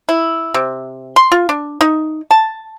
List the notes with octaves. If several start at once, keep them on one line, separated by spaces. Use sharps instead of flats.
E4
C3
C6
F4
D4
D#4
A5